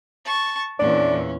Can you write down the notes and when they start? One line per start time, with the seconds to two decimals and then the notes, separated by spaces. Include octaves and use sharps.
0.25 A5 C#6
0.80 E2 A#2 C#4 D4